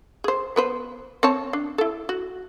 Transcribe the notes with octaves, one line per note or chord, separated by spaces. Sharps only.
G#4 C5
B3 B4 C5
C4 C#5 A5
D4
E4 A4
F#4